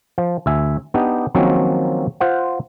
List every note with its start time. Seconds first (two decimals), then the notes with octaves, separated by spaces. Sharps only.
0.18 F3
0.46 D2 E5 G#5
0.94 B3 D4 D#4 G4
1.35 D#3 F3 F#3 A#3 C4 C#4
2.20 F4 C5 F#5